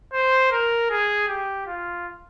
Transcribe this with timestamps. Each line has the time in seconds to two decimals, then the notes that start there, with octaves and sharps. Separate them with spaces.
0.13 C5
0.51 A#4
0.90 G#4
1.28 G4
1.67 F4